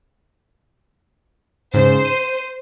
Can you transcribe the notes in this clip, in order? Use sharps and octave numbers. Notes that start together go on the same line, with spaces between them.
G#2 C#3 C5
D#7